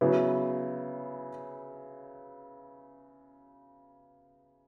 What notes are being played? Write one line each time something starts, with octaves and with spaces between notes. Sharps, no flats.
C#3 F#3 B3 E4